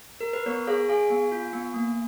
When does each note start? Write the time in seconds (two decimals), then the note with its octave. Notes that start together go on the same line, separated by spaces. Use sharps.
0.20 A#4
0.33 B4
0.46 B3 A#4 C#5
0.67 G#4 C#5 F5
0.89 G#4 F5 G#5
1.10 B3
1.32 F4
1.53 B3
1.74 A#3